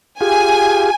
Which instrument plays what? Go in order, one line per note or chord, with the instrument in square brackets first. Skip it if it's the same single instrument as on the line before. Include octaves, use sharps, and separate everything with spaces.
[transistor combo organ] F4 G4 G#4 [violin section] G#5